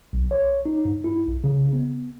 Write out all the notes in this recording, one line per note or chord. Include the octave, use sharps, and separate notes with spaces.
B1
C#5
D#4
G2
E4
B1
C#3
B3